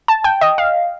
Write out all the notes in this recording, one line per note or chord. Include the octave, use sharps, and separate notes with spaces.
A5
G5
D#5
F5